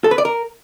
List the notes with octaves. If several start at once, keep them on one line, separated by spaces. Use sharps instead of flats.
A4
B4
D5
A#4